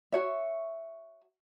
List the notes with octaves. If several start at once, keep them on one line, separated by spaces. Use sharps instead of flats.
F#4 C#5 E5